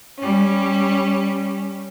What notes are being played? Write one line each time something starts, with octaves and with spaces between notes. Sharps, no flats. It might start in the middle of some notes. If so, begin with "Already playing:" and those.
G3 C#4